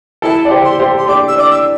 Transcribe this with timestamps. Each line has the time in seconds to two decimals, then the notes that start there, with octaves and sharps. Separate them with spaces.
0.22 E4 A4 A5
0.45 D5
0.50 G4 C5
0.64 C6
0.79 G4 C5
0.98 C6
1.07 D4 G4 D6
1.28 E6
1.36 D4 D6
1.50 E6